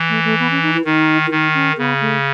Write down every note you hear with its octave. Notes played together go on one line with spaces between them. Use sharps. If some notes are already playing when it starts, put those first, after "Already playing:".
Already playing: E3
A3
A3
B3
C#4
D#4
E4
D#3 D#4
E4
D#3 D#4
C#4
C#3 B3
A3